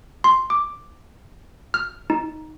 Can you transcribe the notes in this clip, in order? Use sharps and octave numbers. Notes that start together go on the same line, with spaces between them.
C6
D6
F6
D#4